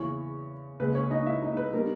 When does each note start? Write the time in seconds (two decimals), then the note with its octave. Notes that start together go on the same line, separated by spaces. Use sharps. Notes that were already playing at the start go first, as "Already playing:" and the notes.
Already playing: E2 C#3 E3 C#4 C#5
0.80 C#2 C#3 G#3 B4
0.95 C#4 C#5
1.11 D#4 D#5
1.26 E4 E5
1.42 D#4 D#5
1.57 B4
1.73 G3 B3 D#4 A#4